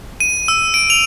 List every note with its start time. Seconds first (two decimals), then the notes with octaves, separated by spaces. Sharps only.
0.20 D#7
0.48 E6
0.74 D7
0.90 F7